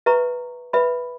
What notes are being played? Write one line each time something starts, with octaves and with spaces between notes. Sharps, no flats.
B4 E5 A#5 C#6
B4 E5 B5